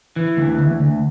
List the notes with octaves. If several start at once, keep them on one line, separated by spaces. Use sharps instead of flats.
E3
D2
D2
D2